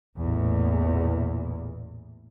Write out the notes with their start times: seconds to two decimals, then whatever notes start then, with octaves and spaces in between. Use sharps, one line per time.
0.16 A1 E2 A#2